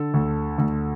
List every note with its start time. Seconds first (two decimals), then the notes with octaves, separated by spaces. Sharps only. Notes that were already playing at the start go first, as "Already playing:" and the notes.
Already playing: D3 A4
0.14 D2
0.58 D2